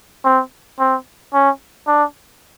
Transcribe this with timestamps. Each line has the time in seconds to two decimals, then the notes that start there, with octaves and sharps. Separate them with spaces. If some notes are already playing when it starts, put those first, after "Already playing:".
0.24 C4
0.79 C4
1.33 C#4
1.87 D4